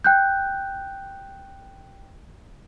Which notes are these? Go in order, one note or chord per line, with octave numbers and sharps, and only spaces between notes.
G5 F#6 G6